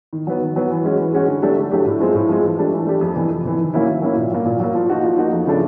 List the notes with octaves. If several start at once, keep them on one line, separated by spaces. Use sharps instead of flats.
D#3
F#3 B3
D#3
F#3 B3
E3
G#3 C#4 F#4
E3
G#3 C#4 F#4
D3
F#3 A3 D4 G4
D3
F#3 A3 D4 G4
A2
F3 G#3 C4
A2
F3 G#3 C4
E3
A3 D4 G4
E3
A3 D4 G4
F2
C3 E3
F2
C3 E3
D#3
F#3 A#3 C#4 E4
D#3
F#3 A#3 C#4 E4
A#2
F#3 A#3
A#2
F#3 A#3
F3
A#3 D#4 F#4
F3
A#3 D#4 F#4
F2
C#3 F3 A3 D4